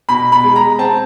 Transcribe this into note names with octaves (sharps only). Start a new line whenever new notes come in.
B2 B5
B5
G#3
A#5
C4 A5